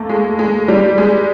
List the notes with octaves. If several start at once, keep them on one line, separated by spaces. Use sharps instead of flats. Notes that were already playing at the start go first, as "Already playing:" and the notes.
Already playing: A3 A#3
G#3
G#3
G3
G#3